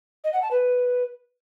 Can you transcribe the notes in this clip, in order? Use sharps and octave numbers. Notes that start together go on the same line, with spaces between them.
D#5
F#5
A5
B4